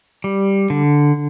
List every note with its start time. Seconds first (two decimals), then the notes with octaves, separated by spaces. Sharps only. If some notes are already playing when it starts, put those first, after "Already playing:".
0.24 G3
0.70 D3